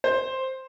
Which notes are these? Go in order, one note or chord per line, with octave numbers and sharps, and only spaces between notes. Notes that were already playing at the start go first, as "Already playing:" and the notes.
C5